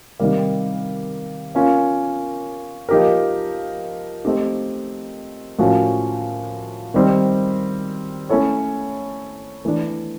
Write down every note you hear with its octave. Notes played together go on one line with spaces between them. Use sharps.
C3 D#3 G3 A#3
A#3 C#4 F4
F3 A#3 D#4 G4 A#4
A3 C4 D#4 G4
A2 F3 A#3 C#4 F#4
D#3 G3 C4
A3 C#4 E4 A4 C#5
E3 A3 D4